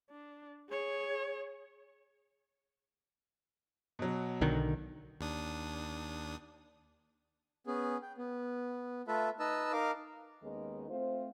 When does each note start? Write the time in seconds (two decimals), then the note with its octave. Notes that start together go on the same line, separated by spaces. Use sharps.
0.10 D4
0.70 G#4 C#5
3.99 B2 F#3
4.41 B1 D3 D#3
5.21 D#2 D4 D#6
7.67 B3 C#4 G#4
8.02 G5
8.17 B3
9.07 A3 F4 A4 B4 E5
9.40 D#4 B4 D#5 A5 E6
9.73 D#4 A#4 F5 D6
10.42 D#2 D#3 G#3 B3 C#4 D#4
10.89 A3 C4 F4 C5